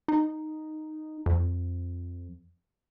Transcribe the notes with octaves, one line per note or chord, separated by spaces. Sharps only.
D#4
F2